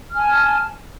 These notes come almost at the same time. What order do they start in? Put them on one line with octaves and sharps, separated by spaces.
F6 G#5 A5